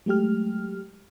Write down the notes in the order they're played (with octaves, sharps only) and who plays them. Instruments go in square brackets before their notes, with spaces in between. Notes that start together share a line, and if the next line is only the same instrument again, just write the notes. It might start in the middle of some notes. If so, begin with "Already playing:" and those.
[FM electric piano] F#3 G#3 A3 G4 F6